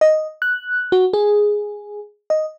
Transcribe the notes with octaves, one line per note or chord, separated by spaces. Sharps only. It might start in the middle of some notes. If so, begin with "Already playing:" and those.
D#5
F#6
F#4
G#4
D#5